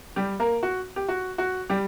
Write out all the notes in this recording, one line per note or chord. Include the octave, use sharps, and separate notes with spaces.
G3 G4
A#3 A#4
F#4
G4
F#4
F#4
G3 G4